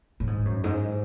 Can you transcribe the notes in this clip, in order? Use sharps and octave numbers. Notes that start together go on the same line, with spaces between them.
A2
G#2
F#2
G#2